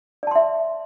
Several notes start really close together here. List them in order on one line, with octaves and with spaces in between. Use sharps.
D5 A5 C6 E5